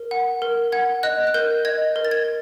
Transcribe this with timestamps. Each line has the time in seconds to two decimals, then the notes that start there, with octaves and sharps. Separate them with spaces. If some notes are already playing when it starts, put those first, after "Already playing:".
Already playing: A#4
0.11 F#5
0.42 A#4
0.72 F#5 G#6
1.03 D#5 F#6
1.27 F#6
1.34 A#4 G6
1.65 D#5 G#6
1.96 A#4
2.05 A6
2.11 G#6